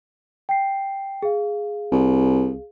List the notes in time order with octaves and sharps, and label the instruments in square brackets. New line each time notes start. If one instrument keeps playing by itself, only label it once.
[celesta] G5 C7
G#4 F5
[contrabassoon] C2